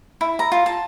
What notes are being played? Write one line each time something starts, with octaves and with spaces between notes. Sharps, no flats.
E4
A#5
F4
A5